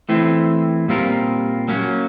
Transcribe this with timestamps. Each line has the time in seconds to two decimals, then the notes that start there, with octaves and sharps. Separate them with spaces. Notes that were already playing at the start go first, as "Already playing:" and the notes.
0.09 E3 A3 C4 E4
0.88 A#2 G3 C4 F4 A#4
1.68 F#3 A#3 C#4